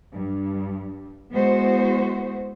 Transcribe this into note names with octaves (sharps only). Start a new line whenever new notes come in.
G2
G#3 B3 E4 F#4 C5